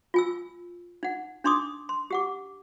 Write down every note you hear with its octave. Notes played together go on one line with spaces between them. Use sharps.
F4 G#5 E6
D#4 F#5
D4 D#4 C6 D6 D#6
C6
G4 F#5 D6